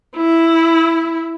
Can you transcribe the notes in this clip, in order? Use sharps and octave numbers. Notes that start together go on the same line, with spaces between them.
E4